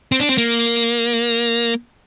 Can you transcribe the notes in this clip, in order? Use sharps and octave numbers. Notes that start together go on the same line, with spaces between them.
C4
D4
C4
A#3